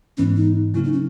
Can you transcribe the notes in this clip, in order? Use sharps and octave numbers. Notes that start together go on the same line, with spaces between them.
G#2 E3 B3 C#4
D#4
C#3 F#3 A#3 E4
D#4
C#4